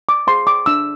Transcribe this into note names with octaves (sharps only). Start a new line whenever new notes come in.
D6
G#4 C5 C6
D6
D4 E6